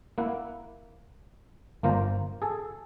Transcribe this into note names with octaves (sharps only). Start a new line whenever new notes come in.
A#3 E4 F#5
G1 A#3 F4 C5 A#5
G#4 A4